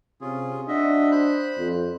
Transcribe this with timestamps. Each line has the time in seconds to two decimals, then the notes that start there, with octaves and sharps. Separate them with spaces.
0.21 C3 C#4 F4 G#4
0.68 D4 F#4 D#5 E5
1.11 C5 B5 F#6
1.58 F2